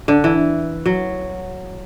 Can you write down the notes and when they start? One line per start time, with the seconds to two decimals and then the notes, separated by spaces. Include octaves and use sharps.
0.08 D3
0.24 E3
0.86 F#3